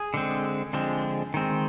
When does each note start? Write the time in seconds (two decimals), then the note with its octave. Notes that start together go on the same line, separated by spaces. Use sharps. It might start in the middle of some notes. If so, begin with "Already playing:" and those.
Already playing: G#4
0.14 D3 G#3 C4
0.73 D3 F3 G#3 C4
1.34 D#3 G#3 C4